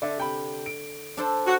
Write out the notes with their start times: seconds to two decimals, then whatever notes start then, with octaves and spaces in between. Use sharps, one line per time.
0.02 D3 D5 E5
0.17 C3 G5 B5
0.66 D7
1.17 D4 A4 C5
1.46 F#4